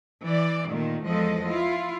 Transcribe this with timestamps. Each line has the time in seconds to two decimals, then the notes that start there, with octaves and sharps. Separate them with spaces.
0.24 E3 D5
0.71 A#2 D#3 A3
1.06 E2 F3 G#3 A4 D#5
1.50 E4 F4